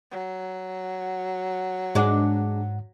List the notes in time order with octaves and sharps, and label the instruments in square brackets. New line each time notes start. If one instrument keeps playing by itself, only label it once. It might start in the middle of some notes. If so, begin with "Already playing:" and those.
[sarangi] F#3
[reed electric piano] G#2 F#5 [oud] G#3 D4